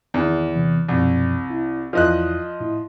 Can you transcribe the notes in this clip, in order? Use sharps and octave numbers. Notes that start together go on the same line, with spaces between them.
E2 D#3
C3 E3
C2 F#2 B2 F3
E4
E2 F3 E4 D5 D#5 F#6
A2 E4